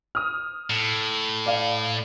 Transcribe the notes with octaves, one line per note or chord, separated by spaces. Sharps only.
D#6 F6
A2
D5 F5